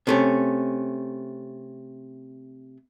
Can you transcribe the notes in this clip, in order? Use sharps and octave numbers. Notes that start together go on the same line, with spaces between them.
C3 A3 C#4